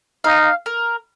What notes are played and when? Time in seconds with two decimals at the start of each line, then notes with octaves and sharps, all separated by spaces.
0.24 D#4 F5
0.66 A#4